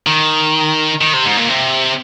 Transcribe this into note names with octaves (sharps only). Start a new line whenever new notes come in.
D#3
D#3
C3
G#2
A#2
C3